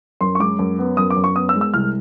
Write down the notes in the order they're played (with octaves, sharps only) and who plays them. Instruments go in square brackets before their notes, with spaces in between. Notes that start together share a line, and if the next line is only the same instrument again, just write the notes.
[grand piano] F#2 C6
C#6
G#3 D6
F#2
B3
F#2 D#6
D6
F#2
C#6
B3 D#6
E6
G#3
E6
C2 F6